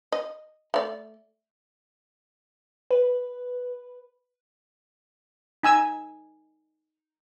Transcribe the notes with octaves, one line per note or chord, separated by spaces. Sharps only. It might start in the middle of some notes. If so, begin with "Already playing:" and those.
D#5
A3 D5
B4
D#4 G#5 E6